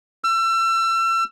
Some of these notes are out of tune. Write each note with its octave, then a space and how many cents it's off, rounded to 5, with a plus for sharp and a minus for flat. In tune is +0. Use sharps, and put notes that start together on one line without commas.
E6 +35